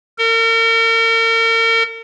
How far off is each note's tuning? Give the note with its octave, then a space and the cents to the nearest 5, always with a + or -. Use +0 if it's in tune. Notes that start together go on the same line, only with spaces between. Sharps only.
A#4 -40